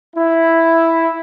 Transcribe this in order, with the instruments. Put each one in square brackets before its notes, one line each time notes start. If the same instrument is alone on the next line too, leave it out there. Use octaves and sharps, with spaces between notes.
[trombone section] E4